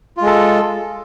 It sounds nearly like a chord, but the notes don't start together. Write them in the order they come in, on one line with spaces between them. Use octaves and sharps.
F4 G#3 A4